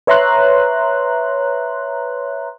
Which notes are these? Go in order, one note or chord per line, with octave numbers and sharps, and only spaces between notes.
B4 C#5 E5 A#5 C6 F#6